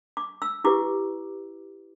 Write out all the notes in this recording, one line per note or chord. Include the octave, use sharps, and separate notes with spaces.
D6
E6
E4 G4 B4 D6